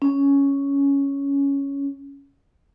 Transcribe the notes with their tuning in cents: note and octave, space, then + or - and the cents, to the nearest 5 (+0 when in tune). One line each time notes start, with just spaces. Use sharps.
C#4 +5